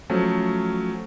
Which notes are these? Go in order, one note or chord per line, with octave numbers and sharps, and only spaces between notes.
F3 F#3 A3 C#4